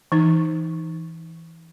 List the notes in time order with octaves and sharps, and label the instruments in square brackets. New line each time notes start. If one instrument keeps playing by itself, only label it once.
[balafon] E3 D#4